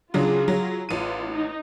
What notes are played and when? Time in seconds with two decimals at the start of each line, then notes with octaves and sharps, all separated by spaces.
0.14 C#3 F#3 D4 F4 G#4
0.48 F#3
0.89 A1 E3 F4 D#7
1.30 D#4